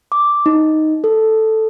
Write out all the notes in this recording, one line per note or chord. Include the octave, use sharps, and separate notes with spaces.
D6
D#4
A4